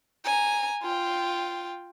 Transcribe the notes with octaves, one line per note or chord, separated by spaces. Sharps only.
G#5 A#5
F4 G5